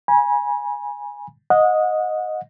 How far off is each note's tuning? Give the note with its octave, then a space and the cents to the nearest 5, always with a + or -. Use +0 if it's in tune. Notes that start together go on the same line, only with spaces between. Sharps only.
G#5 -5 B5 -40
D#5 +0 F#5 -30